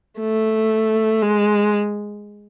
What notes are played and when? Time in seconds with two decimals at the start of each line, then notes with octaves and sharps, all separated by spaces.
0.20 A3
1.22 G#3